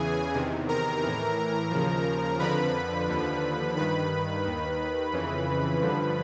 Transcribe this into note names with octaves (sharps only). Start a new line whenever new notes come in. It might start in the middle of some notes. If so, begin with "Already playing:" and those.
Already playing: E2 C#3 E3 G#4 G#5
E2 C3 D#3
A#4 A#5
A2 E3
D#2 C#3 F3
F2 D3 F3 B4 B5
D#2 D3 F3
G2 D#3 B4 B5
D#2 D#3
F2 C#3 E3
G2 D3 F3